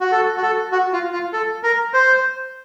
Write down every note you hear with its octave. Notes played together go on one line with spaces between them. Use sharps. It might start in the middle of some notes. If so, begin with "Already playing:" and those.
F#4
A4
F#4
A4
F#4
F4
F4
A4
A#4
C5